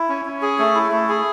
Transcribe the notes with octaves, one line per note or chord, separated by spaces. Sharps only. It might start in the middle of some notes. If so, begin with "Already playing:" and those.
Already playing: E4
C#4
C#4
G#4
A3
E4
A3
G#4